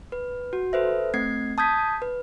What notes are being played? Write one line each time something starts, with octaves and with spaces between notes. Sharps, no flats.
B4
F#4
A4 B4 C5 E5
A3 C4 G#6 C7
A5 D#6 G6 G#6 B6
B4